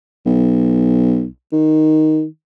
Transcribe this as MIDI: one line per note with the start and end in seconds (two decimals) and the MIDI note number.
0.26 1.28 35
1.52 2.25 51